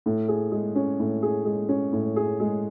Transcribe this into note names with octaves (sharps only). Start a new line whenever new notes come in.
A2
G#4
G#3
C#4
A2
G#4
G#3
C#4
A2
G#4
G#3